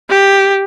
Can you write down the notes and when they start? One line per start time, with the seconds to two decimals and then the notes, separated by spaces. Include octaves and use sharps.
0.10 G4